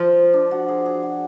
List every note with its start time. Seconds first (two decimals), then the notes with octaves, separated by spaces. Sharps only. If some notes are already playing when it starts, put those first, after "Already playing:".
Already playing: F3
0.34 D4
0.51 F#4
0.68 G#4
0.86 G#4
1.03 F#4